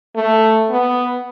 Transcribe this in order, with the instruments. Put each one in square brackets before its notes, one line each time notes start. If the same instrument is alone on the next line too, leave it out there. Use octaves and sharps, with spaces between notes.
[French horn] A3
B3